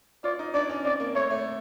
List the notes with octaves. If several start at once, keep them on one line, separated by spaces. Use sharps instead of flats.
F4 D5
D#4
D4 D5
C#4
C4 D5
A#3
A3 C#5
A3